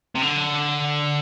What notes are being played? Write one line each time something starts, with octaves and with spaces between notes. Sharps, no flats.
C3
D3